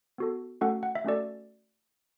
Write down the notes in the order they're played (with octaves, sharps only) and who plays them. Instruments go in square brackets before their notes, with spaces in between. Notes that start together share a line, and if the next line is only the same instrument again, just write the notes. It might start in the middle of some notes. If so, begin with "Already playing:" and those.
[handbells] B3 F#4 A4
A3 C#4 F#4 A4 F#5
F#5
E5
A3 C#4 F#4 A4 D5